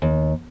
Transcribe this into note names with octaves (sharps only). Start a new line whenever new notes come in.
D#2